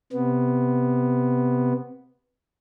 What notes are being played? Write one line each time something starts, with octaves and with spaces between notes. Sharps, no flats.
C3 B3